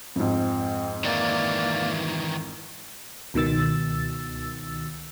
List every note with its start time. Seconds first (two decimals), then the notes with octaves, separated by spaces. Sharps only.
0.16 F2 G#2 C4
1.04 D#3 E3 A#3 D5
3.34 C#2 B2 D#3 E6 A6